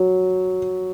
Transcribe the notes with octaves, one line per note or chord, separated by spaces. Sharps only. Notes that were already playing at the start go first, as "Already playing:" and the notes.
Already playing: F#3